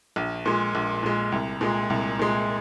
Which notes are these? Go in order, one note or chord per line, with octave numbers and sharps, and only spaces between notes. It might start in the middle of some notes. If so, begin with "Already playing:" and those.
A#1
A#2 G#3
A#1
A#2 G#3
C2
A#2 G#3
C2
A#2 G#3